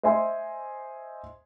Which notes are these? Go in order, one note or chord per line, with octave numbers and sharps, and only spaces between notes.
C5 D#5 E5 G#5 C6